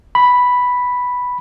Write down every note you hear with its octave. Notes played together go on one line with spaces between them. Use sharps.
B5